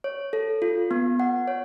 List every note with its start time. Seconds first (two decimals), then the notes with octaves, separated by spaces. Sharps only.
0.04 C#5
0.33 A4
0.62 F4
0.91 B3
1.20 F#5
1.48 C#5